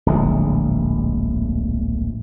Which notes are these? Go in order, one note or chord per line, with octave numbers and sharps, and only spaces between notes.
D1 A#1 G#3